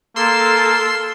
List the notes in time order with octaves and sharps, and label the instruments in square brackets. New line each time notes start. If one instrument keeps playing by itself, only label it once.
[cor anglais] A#3 [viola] A4 [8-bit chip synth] C6 E6 C7